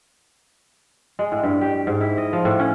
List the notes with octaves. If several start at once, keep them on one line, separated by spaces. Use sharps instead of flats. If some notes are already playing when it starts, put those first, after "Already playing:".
G#3
A2
G2
G4
G#2
E4
D#5
F3
A2
C#4